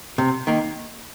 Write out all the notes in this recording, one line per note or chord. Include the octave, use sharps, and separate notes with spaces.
C3
D#3 A#3